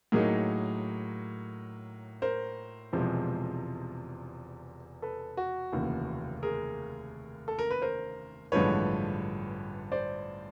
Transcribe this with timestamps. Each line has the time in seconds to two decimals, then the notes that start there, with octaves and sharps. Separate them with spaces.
0.12 A2 F#3 A#3 D#4 G#4 A#4
2.22 A#4 C5
2.92 E1 E2 C3 F3 G#3
5.02 A4 B4
5.37 F#4
5.72 F1 D#2 C#3 E3
6.43 G#4 A#4
7.48 A4
7.59 A#4
7.71 B4
7.82 A#4 C5
8.52 A1 G2 D3 F3 G#3 B4 C#5
9.92 C5 D5